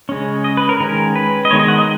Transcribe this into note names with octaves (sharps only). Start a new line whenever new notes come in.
C#3 G#3 C#4
D#5
B4
A#4
D#3 G#3 C#4 A#4
B4
D#5
D#3 G#3 B3 C#5
D#5
F#5
D#5